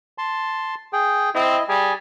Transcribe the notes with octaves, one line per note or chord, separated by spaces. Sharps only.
A5 C6
G#4 G5
C4 E4 D#5
G3 G#4 G#5